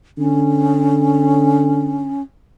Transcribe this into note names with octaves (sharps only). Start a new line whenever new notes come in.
D3 C#4